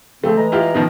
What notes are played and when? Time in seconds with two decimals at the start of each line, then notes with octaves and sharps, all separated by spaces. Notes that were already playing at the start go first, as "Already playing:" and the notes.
0.24 C#3 F3 A3 C4
0.37 E3 G#3 A#5
0.52 E4 F4 G4
0.74 B2 D#3 F3